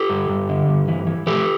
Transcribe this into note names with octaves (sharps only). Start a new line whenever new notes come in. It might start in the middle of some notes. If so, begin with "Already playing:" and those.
Already playing: G4 A4
G2
G2
D3
G2
E3
E3
E3 G4 A4